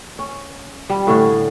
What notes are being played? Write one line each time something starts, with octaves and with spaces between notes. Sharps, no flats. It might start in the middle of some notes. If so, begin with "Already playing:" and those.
C#4
G3
A2 D3 C#4